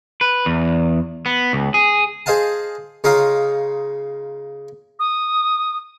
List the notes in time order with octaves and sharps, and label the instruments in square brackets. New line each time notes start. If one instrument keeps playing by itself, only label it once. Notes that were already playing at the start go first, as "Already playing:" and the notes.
[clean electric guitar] B4
E2
B3
C#2
G#4
[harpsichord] G#4 C5 D#5 F5 A5
C#3 D#4 F4 F5 D#6
[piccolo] D#6